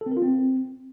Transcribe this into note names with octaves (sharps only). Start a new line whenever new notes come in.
A4
C4
A#4
F4
C4